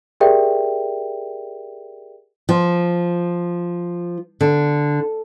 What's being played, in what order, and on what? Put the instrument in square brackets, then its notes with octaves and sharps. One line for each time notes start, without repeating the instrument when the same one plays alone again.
[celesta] G4 G#4 A#4 D5 E5 G5
[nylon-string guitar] F3
D3